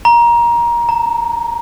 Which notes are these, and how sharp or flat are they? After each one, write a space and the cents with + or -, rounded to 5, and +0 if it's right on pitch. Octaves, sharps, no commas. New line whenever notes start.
A#5 +20
A#5 -30